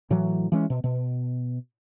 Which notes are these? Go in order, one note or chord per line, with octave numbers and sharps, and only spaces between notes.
A2 E3 F#3
E3 G#3 C#4
B2
B2